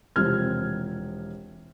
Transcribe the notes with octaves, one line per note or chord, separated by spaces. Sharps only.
E1 C3 F3 C4 F6 G#6